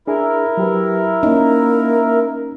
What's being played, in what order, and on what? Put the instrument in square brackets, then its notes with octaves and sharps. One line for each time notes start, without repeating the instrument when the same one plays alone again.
[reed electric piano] D4 G#4 [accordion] E4 A#4
[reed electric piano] F#3 G4 B4
[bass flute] A#3 [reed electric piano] C#4 [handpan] D#4